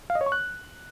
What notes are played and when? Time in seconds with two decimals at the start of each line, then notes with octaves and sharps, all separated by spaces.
0.10 F5
0.15 D#5
0.21 C#5
0.26 C#6
0.32 F#6